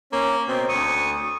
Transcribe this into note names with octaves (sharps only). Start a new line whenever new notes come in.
A#3 C#4
B2 C4
D2 C#6 D#6